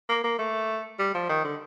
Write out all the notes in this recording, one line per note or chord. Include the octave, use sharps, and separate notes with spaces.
A#3
A#3
A3
G3
F3
D#3
D3